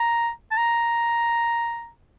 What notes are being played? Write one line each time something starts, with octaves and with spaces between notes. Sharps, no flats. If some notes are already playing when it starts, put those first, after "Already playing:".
Already playing: A#5
A5
A#5